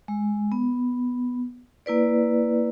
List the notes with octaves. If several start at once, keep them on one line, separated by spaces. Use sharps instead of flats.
G#3
B3
A#3 E4 B4 D5